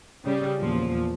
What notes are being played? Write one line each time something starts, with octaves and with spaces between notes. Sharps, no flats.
C#3 G3
E2 A#2 F3